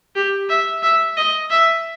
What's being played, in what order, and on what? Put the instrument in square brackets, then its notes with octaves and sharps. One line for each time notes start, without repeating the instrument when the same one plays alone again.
[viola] G4
E5
E5
D#5
E5